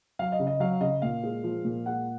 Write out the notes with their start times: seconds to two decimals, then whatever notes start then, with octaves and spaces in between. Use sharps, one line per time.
0.19 F#3 F5
0.32 D#5
0.39 C#3
0.47 D#5
0.60 F#3 F5
0.81 C#3 D#5
1.02 A#2 F5
1.24 G#3
1.43 F3
1.65 A#2
1.86 G#3 F#5